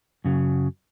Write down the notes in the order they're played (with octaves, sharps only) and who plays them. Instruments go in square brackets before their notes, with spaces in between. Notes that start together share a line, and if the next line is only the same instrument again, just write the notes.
[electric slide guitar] F#2 C#3 F#3